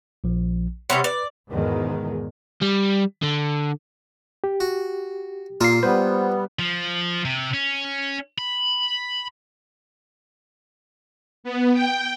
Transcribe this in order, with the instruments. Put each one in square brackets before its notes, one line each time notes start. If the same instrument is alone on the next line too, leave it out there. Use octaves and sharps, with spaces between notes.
[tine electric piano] A#1 F3
[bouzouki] C3 G3 C#4 [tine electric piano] C#5 F#5 B5
[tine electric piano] B4 [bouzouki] D5
[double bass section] E2 G#2 B2 D#3 G#3
[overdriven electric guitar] G3
D3
[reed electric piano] G4
[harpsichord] F#4
[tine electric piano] A#2 C7 [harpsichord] A#3 F4 A4
[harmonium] G3 B3 [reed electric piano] B4 [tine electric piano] C5
[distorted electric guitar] F3
C3
C#4
B5
[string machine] B3
G5